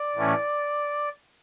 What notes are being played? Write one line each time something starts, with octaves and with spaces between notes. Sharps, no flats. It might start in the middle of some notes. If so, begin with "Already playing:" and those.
Already playing: D5
A2 E3 A3 C#4